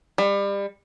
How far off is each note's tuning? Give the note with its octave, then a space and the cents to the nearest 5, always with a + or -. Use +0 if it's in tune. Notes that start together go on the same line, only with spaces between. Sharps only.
G3 +30